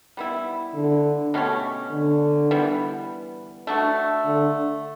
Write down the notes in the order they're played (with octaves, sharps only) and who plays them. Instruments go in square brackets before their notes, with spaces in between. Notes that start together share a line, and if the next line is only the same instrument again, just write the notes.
[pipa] G3 B3 E4
[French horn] D3
[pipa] B2 A3 C#4 G4
[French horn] D3
[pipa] E3 G3 B3
A3 D4 F#4
[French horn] D3